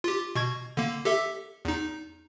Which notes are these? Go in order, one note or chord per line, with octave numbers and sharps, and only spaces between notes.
F4 G4
B2 C#6 G#6
D3 A#3
G4 A4 E5
E2 D#4